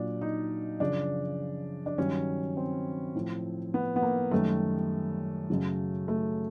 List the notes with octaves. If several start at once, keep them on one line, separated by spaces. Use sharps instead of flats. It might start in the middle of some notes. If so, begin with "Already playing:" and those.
Already playing: A#2 F#3 D4
D#4
F#2 C#3 F3 D4
D4
G2 D#3 F#3 C#4
C4
A2 F3
B3
B3
A#3
F#2 D#3 G3 A3
F#2 C#3 F#3
A3